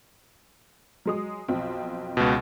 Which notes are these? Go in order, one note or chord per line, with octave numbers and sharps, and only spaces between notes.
F#3 G#3 D#6
B1 F2 C4
C#2 B2